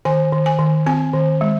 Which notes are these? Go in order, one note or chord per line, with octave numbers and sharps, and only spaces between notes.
D#3 G#5
D#3
G#5
D#3
C4 G#5
D#3
G#3